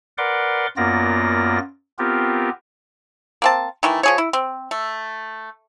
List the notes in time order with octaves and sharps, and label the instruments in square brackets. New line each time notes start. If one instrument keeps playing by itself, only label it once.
[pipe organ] A#4 B4 D5 F#5 C6 D6
F#2 A#3 B3 F4 D5 A#6
B3 C4 F4 G4 A#4
[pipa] A#3 C4 A5
D#3 E3 A3
F3 G#4 C#5
E4
C4
A3